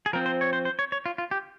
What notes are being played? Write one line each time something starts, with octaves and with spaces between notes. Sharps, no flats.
G#4
F3 C4 A#4
C5
C#5
C5
C5
C#5
C#5
F4
F4
G4